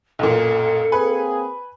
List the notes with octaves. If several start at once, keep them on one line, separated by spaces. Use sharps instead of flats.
B1 F#2 A#2 A4
A#3 C4 G#4 B4 G#5